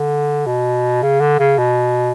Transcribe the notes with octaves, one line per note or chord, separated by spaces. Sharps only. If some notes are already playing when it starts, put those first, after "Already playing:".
Already playing: D3
B2
C#3
D3
C#3
B2